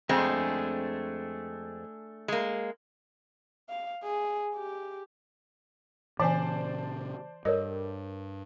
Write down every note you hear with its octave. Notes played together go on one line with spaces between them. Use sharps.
F2 G#3 A3 C4 D4 G#4
G#3 A#3
F5
G#4
G4
A#2 C#3 E3 C5 D5 G#5 A5
G2 A4 A#4 C#5 D#5